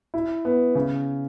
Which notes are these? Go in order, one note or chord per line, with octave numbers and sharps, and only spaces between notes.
E4
B3
C#3